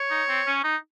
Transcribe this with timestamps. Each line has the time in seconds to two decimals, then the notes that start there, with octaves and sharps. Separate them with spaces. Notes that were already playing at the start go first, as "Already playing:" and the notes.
Already playing: C#5
0.11 D#4
0.29 C4
0.47 C#4
0.64 D#4